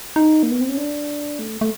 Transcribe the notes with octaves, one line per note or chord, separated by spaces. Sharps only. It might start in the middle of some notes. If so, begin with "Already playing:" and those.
D#4
A#3
B3
C4
C#4
D4
A3
A3